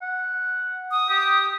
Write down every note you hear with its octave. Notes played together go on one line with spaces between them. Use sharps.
F#5
D#6
G4